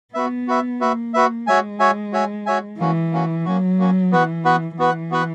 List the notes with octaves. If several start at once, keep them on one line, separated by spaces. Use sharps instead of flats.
B3 F#4 B4 E5
F#4 B4 E5
A#3 F#4 B4 E5
F#4 B4 E5
G#3 F#4 C#5 E5 G#5
F#4 C#5 E5 G#5
F#4 C#5 E5 G#5
F#4 C#5 E5 G#5
E3 A#3 C#4 F#4
A#3 C#4 F#4
F#3 A#3 C#4 F#4
A#3 C#4 F#4
E3 B3 F#4 B4 F#5
B3 F#4 B4 F#5
E3 B3 F#4 B4 F#5
B3 F#4 B4 F#5